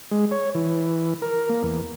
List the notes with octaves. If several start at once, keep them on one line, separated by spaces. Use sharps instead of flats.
G#3
C#5
E3
A#4
A#3
E2